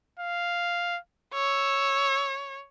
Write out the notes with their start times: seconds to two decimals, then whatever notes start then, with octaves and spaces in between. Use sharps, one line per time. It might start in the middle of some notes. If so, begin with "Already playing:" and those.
0.19 F5
1.34 C#5 E6